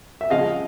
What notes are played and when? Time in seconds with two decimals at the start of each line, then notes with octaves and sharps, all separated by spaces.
0.21 E5
0.30 C#3 F3 G#3 D#5 F5